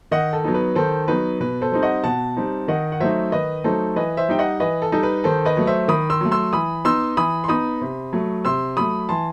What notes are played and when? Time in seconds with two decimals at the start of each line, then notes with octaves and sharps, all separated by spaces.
0.11 D#3 D#5 F#5
0.33 A4
0.44 F#3 B3 D#4
0.54 B4
0.75 D#3 A4 C5
1.08 F#3 B3 D#4 B4
1.40 B2 B4
1.61 A4 C5
1.72 G3 C4 D#4
1.82 D#5 F#5
2.04 B2 F#5 A5
2.37 G3 C4 D#4
2.68 D#3 D#5 F#5
2.92 F#5
3.00 F#3 A3 D#4 C5 E5
3.32 D#3 B4 D#5
3.64 F#3 A3 D#4 A4 C5
3.96 E3 B4 D#5
4.17 C5 E5
4.29 G3 D#4 G5
4.39 D#5 F#5
4.60 E3 B4 D#5
4.82 A4
4.92 G3 D#4 A4
5.03 B4
5.24 D#3 A4 C5
5.45 B4 D#5
5.57 F#3 A3
5.67 C5 E5
5.88 D#3 B5 D#6
6.10 C6 E6
6.21 F#3 A3
6.31 C6 E6
6.53 E3 B5 D#6
6.85 B3 D#4 C6 E6
7.17 E3 B5 D#6
7.44 C6
7.48 B3 D#4 B5 D#6
7.81 C3
8.13 F#3 A3
8.45 C3 C6 E6
8.77 F#3 A3 B5 D#6
9.09 E3 A5 C6